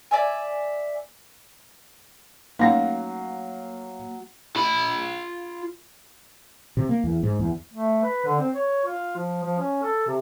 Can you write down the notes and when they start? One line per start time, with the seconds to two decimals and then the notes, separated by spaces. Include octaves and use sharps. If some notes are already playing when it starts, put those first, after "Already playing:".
0.11 D5 E5 G#5
2.59 F#3 A3 A#3 C#4 D#4 F5 A#6
4.56 F4 B5
6.77 C3
6.89 A#3
7.04 E2
7.23 G#2
7.39 E2
7.73 A3
8.03 B4
8.25 D3
8.39 C4
8.53 C#5
8.86 F4
9.17 F3
9.43 F3
9.59 C#4
9.83 A4
10.07 C3